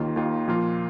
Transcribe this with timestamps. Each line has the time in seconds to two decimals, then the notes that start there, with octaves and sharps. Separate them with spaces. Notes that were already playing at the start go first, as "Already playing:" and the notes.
Already playing: D#2 D#3 A#3 F4
0.16 D#2 D#3 A#3 F4
0.48 A#2 F3 A#3 F4